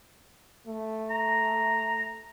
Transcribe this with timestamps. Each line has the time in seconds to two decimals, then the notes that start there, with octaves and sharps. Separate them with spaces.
0.67 A3
1.10 A#5